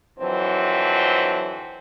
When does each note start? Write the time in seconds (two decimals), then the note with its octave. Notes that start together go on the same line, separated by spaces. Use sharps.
0.19 F2 D3 E3 F#3 C4